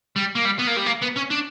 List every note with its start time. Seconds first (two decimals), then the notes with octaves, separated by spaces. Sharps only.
0.16 G3
0.35 A#3
0.45 G3
0.59 B3
0.68 A#3
0.77 G3
0.86 A#3
1.02 B3
1.16 C#4
1.30 D4